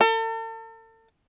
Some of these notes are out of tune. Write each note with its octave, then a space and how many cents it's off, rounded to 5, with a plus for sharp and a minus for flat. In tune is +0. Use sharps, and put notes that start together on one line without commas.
A4 +40